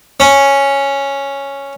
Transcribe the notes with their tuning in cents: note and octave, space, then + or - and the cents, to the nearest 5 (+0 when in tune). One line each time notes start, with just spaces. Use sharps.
C#4 +0